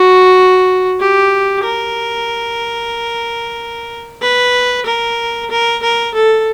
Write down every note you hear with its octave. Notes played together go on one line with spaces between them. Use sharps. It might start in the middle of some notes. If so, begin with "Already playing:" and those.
Already playing: F#4
G4
A#4
B4
A#4
A#4
A#4
A4